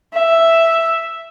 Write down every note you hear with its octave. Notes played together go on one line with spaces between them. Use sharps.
E5